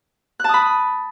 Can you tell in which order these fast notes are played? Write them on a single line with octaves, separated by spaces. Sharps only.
F#6 A5 D#6 B5